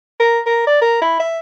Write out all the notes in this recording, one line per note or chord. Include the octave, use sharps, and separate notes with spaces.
A#4
A#4
D5
A#4
E4
E5